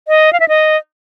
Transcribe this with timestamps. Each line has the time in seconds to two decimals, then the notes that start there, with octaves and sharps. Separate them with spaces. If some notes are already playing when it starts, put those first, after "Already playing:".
0.08 D#5
0.33 F5
0.40 E5
0.48 D#5